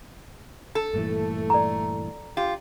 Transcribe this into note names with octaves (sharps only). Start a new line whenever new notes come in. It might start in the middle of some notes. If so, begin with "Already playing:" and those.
A4
G2 A#2 E3 A3
D5 A#5
F4 G4